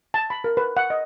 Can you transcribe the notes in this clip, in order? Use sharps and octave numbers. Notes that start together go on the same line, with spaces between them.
A5
B5
A#4
B4
F#5
D#5